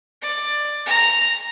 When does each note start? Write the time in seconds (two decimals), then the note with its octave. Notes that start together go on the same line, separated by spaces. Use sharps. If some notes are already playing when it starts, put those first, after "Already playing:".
0.22 D5
0.86 A#5